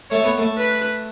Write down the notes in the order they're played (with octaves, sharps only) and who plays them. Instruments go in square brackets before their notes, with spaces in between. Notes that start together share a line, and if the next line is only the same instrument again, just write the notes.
[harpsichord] A3 [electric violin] C#5
[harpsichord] B3
A3
[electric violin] B4